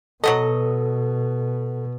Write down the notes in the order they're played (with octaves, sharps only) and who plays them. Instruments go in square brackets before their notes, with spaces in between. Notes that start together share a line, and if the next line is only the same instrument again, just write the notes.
[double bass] B2 [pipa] F#3 B3 D#5 [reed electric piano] A4